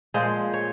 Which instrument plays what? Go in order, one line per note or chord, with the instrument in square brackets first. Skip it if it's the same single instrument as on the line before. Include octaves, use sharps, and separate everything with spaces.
[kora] A#2 F3 G#3 C5
C#5